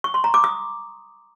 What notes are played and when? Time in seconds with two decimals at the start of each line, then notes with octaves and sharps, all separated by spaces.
0.04 C#6
0.14 C6
0.24 A#5
0.34 D6
0.44 D#6